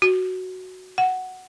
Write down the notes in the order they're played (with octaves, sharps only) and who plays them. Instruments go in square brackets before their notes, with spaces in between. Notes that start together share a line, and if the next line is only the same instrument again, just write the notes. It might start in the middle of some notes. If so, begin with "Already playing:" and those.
[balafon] F#4
F#5